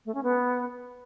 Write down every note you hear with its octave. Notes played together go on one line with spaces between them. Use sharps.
A3
C#4
B3